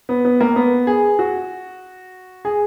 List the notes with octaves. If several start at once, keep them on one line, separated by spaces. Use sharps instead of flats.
B3
B3
A#3
B3
G#4
F#4
G#4